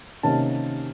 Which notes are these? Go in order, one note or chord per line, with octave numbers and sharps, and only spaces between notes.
C3 D#3 A#3 C#4 A5